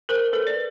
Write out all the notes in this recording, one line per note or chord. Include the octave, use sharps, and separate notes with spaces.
A#4 C5
A4 B4
D5